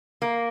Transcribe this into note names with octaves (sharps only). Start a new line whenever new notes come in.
A#3